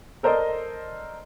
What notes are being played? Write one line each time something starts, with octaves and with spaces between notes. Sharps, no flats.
A4 A#4 C5 D5 D#5